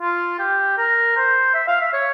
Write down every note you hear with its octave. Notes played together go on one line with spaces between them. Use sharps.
F4
G4
A#4
C5
E5
F5
E5
C#5